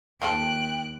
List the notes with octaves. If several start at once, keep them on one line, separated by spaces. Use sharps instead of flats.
D#2 F3 F4 A4 G5 F#6 D7